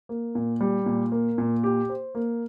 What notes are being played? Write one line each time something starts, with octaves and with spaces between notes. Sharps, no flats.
A#3
A#2
G3
A#2
A#3
A#2
G4
C5
A#3